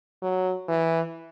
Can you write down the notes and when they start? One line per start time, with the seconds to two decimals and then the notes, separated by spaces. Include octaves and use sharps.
0.22 F#3
0.69 E3